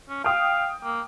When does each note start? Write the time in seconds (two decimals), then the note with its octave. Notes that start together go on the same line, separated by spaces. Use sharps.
0.09 C#4
0.24 F5 G5 D#6
0.84 A#3